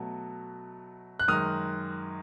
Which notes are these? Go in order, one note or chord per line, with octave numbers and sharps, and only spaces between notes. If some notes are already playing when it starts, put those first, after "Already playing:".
Already playing: B2 F#3 A3
F#6
F#2 D#3 G#3 D#6 F6